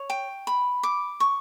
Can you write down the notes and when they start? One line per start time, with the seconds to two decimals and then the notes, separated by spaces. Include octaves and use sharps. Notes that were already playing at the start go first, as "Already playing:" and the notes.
Already playing: C#5
0.10 G5
0.47 B5
0.83 D6
1.20 C#6